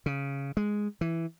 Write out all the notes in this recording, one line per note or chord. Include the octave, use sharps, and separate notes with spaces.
C#3
G#3
E3